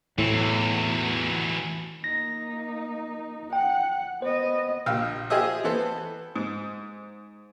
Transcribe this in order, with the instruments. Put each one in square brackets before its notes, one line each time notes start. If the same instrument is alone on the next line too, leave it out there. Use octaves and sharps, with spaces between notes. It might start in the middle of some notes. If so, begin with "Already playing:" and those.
[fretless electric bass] A2 [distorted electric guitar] E3 F#3 [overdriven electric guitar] C4
[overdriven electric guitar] E2
[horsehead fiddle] A#3 D#4 [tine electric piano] A#6
[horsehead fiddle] F#5 [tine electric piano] G5
[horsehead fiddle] B3 D#5 [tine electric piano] C5
[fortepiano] A#1 F5 G5 E6
F4 G4 G#4 C5 D#5 E5
E3 B3 A4 C5
G#2